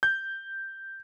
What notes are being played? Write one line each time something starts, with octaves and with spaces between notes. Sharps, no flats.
G6